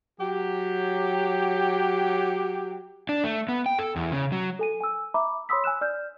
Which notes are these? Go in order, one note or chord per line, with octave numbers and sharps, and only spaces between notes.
F#3 G4
D4
A3
B3
G5
A4
E2
C#3
F#3
A4 G#5 D#7
G#5 E6
E5 A#5 B5 D6
C#5 B5 C6 D#6 E6 B6
G#5 E6 F#6 E7
D5 F6 G6